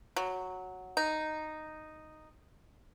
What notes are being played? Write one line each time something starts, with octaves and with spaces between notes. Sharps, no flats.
F#3
D#4